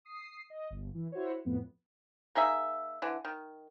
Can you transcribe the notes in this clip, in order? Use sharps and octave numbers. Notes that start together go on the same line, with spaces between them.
D#6 C7
D#5
G1
E3
E4 F#4 C5 C#5
F2 A2 B3
A#3 D#4 G#4 E5
D3 E3
D#3